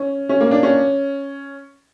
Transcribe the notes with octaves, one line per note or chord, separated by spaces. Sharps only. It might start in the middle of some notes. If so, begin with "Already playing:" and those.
Already playing: C#4
C#4
A#3
D4
C#4